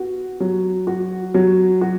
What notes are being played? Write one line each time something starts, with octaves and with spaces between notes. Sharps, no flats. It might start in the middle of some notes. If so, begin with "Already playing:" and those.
Already playing: B3 F#4
F#3
F#4
F#3
F#4